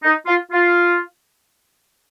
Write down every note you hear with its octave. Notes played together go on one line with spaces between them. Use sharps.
D#4
F4
F4